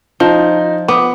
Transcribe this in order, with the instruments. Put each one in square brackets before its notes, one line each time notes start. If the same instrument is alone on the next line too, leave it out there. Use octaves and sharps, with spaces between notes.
[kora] F3 [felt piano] D#4
[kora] B3 [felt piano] D6